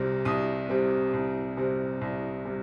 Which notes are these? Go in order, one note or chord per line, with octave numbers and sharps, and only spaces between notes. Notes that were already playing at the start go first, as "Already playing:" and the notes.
Already playing: C2 C3 G3 C4
C2 D#6
C3 G3 C4
C2
C3 G3 C4
C2
C3 G3